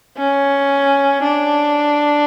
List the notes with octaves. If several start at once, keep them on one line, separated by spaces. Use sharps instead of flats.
C#4
D4